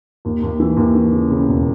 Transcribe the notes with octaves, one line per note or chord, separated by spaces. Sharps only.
D#2
D#2
E3
D#2
E3
C#3
C#3
E1